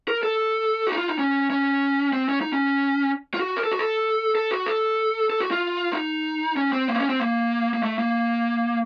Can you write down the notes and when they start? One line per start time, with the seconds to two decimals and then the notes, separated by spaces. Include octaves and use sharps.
0.08 A#4
0.23 A4
0.87 F#4
0.92 D#4
0.98 F4
1.08 D#4
1.19 C#4
1.50 C#4
2.13 C4
2.29 C#4
2.41 D#4
2.53 C#4
3.34 F4
3.40 F#4
3.56 A#4
3.64 A4
3.71 F#4
3.79 A4
4.35 A4
4.51 F#4
4.66 A4
5.30 A4
5.40 F#4
5.51 F4
5.93 D#4
6.57 C#4
6.73 C4
6.88 A#3
6.94 C4
6.99 C#4
7.09 C4
7.20 A#3
7.74 A#3
7.83 A3
7.99 A#3